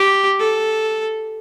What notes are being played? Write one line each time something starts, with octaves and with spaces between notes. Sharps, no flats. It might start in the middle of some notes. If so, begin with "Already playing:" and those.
Already playing: G4
A4